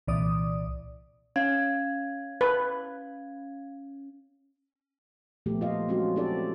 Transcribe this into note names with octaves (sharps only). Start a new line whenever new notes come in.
C2 A#2 E3 D5 D#6
C#4 F5 G#6
B4
A#2 F3 A3 B3 G4
F4 A4 D#5 F5
F#3 G#3 C4 C#4 F4 F#4
C4 D#4 E4 G4 A4 D5